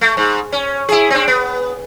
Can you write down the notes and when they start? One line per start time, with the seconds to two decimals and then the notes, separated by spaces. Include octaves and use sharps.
0.01 A3
0.17 G#2
0.52 C#4
0.89 E4 G#4
1.10 C4 D4
1.28 B3